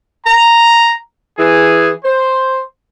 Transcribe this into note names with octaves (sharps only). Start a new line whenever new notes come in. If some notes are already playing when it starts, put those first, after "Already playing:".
A#5
E3 G#4
C5